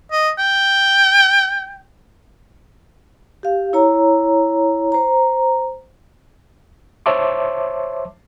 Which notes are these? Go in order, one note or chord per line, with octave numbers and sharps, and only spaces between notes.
D#5
G5
G4 F5
E4 C#5 A#5
C5 A#5
C5 C#5 E5 A5 C6 D6